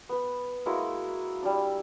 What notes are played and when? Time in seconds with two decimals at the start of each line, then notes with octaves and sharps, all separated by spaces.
0.09 B3 B4
0.66 G#3 A#3 E4 F#4
1.42 G3 D4